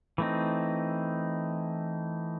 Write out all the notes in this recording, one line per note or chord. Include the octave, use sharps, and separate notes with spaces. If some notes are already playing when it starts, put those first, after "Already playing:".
E3 A3 C4 D#4